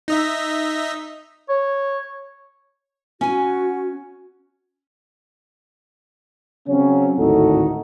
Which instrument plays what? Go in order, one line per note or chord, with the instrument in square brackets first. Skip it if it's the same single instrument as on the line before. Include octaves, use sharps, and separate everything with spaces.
[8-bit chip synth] D#4 D#5 E5
[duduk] C#5
[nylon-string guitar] C#4 G#5 [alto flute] F#4
[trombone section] C#3 F#3 C4 C#4
G#1 D2 A2 D#4 F#4 A4